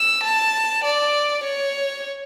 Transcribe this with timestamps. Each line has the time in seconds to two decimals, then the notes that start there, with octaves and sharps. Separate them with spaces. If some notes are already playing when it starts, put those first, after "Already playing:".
Already playing: E6
0.24 A5
0.85 D5
1.44 C#5